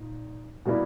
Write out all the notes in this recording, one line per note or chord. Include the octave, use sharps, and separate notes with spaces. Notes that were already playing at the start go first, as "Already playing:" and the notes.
Already playing: A#2 D#4
B2 G3 A#3 E4